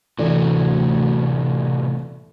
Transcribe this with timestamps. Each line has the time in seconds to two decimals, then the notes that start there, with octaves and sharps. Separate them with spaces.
0.19 D2 A2 C3 E3 A4 D5